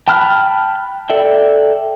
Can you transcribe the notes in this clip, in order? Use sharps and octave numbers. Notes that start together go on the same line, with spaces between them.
G5 A5 B5 F6 F#6
A4 D5 E5 G5